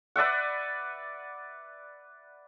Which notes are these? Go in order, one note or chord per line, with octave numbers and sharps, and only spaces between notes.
B4 D5 E5 F#5